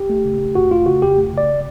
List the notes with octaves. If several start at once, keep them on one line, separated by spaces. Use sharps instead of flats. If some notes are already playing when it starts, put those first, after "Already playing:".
Already playing: G4
A3
C#3
A3
F2 F#4
A3 F4
C#3 F#4
F2 G4
A3
C#3 D5